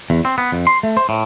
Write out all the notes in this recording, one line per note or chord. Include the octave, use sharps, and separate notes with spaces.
E2
C4
B3
F2
C6
A3
C5
A2